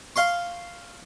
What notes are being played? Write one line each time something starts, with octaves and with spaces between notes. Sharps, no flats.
F5 C6 C#6